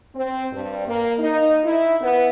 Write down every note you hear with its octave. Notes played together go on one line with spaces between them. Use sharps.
C4
G2
A#3
D#4
E4
B3